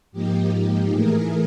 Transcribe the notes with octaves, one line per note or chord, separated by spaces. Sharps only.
G#2 F3 A#3 D#4 G4
A2 E3 A3 G#4 A#4